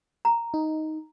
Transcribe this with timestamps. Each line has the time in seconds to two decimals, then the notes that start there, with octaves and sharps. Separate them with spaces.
0.25 A#5
0.54 D#4